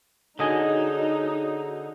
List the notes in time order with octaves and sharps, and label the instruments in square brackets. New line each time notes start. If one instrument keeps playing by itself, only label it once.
[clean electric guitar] D3 D#5 G#5 [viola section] D#4 [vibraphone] F#4 G#4 C#5